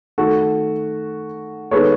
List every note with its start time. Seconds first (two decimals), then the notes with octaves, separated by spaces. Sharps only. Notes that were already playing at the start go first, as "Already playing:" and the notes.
0.18 D#3 A3 F#4 A4
1.71 D#3 G#3 B3 A4 C#5